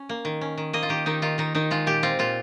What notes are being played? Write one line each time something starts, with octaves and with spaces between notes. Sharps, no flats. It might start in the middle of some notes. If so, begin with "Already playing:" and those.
Already playing: C#4
A#3
D#3
C#4
D#3
A#3 D#5
F4
D#3 G4
D#3 D#4
D#3 F4
D#3 D#4
D#3 D#4
G#3 F4
A#2 G4
C4 F4
A#2 F4